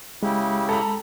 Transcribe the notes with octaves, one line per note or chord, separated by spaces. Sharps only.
C#3 G#3 E4 G4
A4 A#5 B5